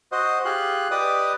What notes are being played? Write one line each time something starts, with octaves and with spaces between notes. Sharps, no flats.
F#4 C5 D#5
F4 G4 G#4 C6 F#6
G4 B4 D5 D#5 D6 D#6